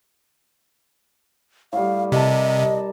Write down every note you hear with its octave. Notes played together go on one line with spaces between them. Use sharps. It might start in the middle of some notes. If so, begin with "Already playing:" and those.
A2 G3 F5
C3 A#4 D#5 A5